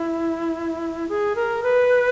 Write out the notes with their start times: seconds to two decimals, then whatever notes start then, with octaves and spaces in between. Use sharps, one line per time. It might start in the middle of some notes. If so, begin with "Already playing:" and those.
Already playing: E4
1.09 G#4
1.36 A#4
1.63 B4